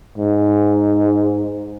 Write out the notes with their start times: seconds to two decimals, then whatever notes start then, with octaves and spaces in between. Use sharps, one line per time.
0.18 G#2